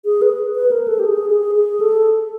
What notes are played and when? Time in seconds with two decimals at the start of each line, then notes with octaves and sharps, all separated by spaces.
0.05 G#4
0.22 B4
0.55 B4
0.71 A#4
0.88 A4
0.99 G4
1.05 G#4
1.30 G#4
1.55 G#4
1.80 A4